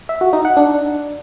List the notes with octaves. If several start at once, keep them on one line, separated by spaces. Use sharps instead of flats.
E5
F#4
D#4
F#5
D4